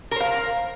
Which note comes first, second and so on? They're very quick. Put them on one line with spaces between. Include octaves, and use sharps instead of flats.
A#4 C5 F5